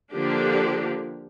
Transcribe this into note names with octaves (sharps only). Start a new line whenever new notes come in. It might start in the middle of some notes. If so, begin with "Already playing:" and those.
D3 F3 A#3 D4 G4